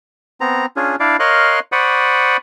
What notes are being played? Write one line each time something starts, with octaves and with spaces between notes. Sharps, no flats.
B3 C4 A#5
C#4 D4 F4 G#4
D4 E4 D5 F5
A#4 C#5 D#5 F5 C6 F#6
C5 D5 F#5 B5 C#6 D#6